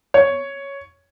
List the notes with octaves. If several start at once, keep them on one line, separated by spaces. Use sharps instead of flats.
C#5